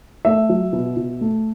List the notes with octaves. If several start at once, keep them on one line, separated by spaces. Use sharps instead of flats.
A3 E5
F#3
B2
B2
A3